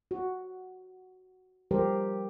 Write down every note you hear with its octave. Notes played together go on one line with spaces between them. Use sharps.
F#4
F3 G3 G4 A#4 C5